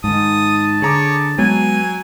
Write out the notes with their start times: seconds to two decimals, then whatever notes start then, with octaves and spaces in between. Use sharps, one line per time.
0.04 G#2 D#3 A5 D#6
0.82 D3 G#4 C#5 A#5 D6
1.38 F#3 G#3 B3 G#5